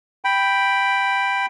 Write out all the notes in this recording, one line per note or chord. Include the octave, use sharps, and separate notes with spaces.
G5 B5